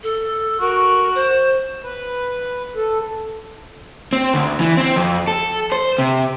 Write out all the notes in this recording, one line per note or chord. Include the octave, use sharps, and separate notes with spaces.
A4
F#4 A#4
C5
B4
A4
C4
D2
E3
C4
F2
A4
C5
C3